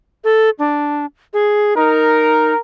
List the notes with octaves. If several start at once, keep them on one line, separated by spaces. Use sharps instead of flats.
A4
D4
G#4
D#4 A#4